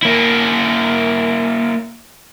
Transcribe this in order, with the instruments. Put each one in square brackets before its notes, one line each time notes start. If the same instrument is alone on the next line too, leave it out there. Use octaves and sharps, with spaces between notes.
[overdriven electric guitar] A#3 E4